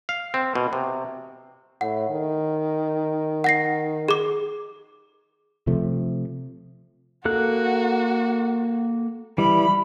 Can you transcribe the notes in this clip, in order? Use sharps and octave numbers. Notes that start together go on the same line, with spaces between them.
F5
C4
B2
C3
A2 F#5
D#3
F#5 A#6 C7
G#4 D6
C3 F3 A3
A#3 F#4 A4 F#6
E3 G3 B5